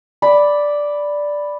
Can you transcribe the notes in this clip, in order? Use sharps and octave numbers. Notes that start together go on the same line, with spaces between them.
D5 B5 D6